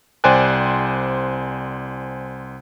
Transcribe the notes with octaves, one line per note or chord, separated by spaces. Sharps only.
C2 C5 D5 G5 G#5 F#6